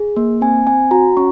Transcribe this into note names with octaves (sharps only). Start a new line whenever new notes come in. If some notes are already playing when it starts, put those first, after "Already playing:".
Already playing: G#4
A#3
C4 G#5
C4 G#5
F#4 A#5
C#4 C#6